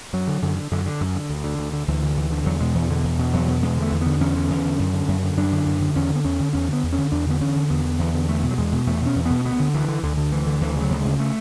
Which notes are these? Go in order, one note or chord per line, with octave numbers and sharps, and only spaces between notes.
F#2 F#3
D3
F#2 D3
D3
F#2 D3
D3
F#2
D3
D2
D3
D2
D3
D2 E3
D3
D2 E3
D3
E2 F#3
B2 G#3
E2 E3
B2 D3
E2
B2
E2 F#3
B2
E2 G#3
D3
A3
E2
D3 B3
E2 C#4
D3
E2
D3
F#2
D3
F#2
D3
F#2 D4
D3
F#2
D3
E2 C#4
D3
B3
E2 C#4
D3
E2 C#4
D3 B3
E2
C#4
D3
E2 D4
D3 B3
E2 C#4
D3
E2 B3
D3
E2
D3
E2 A3
B2
F#3
E2 G#3
B2
E2 A3
B2 C#4
E2
B2 B3
D2 B3
D3
D2 E3
D3
D2 D3
D3
D2 E3
D3
D2 E3
C#3 F#3
D2
C#3 G#3
A3